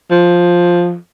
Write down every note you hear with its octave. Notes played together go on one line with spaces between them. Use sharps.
F3